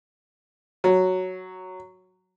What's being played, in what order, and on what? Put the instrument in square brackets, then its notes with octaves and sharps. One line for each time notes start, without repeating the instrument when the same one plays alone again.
[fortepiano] F#3